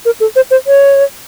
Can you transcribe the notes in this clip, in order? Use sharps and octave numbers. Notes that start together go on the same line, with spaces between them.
A#4
A4
C5
C5
C#5